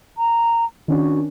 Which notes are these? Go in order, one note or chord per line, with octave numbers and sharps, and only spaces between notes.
A#5
D#3 C#4 D4 F#4